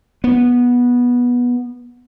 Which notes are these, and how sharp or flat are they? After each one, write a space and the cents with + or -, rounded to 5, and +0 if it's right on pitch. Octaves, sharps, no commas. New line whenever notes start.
B3 -15